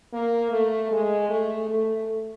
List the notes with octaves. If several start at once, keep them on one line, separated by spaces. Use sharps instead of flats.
A#3
A3
G#3
A3
A3